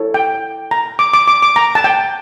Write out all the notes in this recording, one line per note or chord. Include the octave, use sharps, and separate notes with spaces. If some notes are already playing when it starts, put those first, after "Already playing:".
Already playing: E4 A4 C#5
G5
A#5
D6
D6
D6
D6
A#5
A5
G5